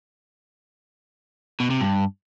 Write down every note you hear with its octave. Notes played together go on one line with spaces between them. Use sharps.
B2
C3
G2